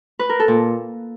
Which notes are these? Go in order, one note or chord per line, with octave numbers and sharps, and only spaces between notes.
B4
A#4
A4
A#2